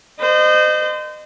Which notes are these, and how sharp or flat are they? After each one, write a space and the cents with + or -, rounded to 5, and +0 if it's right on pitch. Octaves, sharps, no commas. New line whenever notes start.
C5 -30 D#5 -30